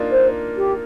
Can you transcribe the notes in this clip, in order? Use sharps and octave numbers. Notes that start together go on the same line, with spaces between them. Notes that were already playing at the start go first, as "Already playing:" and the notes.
Already playing: A#3 D4 D#4 F4
C5
G4